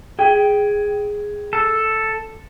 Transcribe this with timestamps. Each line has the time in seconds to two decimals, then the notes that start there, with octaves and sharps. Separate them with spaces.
0.19 G#4 G5
1.53 A4